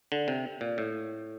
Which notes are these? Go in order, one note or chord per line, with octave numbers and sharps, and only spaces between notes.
D3
C3
A#2
A2